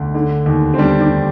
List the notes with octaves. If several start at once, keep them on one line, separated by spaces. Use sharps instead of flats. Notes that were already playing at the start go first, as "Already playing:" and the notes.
Already playing: D2 D4
D3
D#2
C4
G3 D4
D4